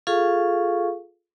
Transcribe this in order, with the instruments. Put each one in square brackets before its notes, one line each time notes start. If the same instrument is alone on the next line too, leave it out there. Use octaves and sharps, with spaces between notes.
[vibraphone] F4 G#4 A4 F5 C#6